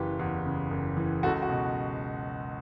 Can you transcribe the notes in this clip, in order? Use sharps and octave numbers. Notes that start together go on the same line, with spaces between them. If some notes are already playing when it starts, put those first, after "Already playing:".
Already playing: F#1 E3 G4 B4
E2
C#3
F#1
E3
C#2 F#4 A4
F#4
B2